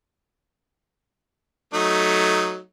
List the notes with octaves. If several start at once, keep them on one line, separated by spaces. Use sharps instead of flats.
F#3 A3 D#4